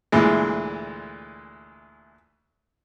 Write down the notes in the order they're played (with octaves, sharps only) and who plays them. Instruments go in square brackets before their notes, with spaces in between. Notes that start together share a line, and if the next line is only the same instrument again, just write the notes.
[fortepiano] D2 A#2 E3 G#3